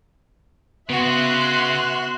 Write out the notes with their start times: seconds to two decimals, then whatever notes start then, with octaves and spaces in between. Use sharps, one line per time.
0.90 C#3 B3 F#4 E5 C6 F#6